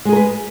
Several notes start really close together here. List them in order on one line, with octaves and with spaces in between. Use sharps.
G#3 G#4 A#4 B4